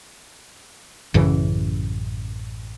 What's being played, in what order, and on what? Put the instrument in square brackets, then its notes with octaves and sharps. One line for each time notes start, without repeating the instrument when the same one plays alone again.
[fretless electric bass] A1 F#2 C#3 E3